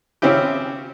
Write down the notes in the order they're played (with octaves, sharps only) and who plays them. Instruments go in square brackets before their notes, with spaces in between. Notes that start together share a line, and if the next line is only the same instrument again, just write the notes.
[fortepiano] C#3 C4 C#4 E4 G4